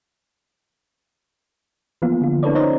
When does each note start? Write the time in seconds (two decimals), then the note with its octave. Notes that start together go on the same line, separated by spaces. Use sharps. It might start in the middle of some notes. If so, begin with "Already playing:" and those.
2.02 E3 F3 A#3 B3 F4
2.21 D3 F4
2.43 C#4 D#4 A4 B4 C#5 D5
2.55 D#4 C5 C#5 D#5 A#5